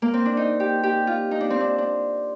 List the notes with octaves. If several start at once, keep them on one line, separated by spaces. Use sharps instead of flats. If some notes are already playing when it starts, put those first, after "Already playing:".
A#3
C4
D4
D#4
G4
G4
F4
D#4
D4
C4
D4
D4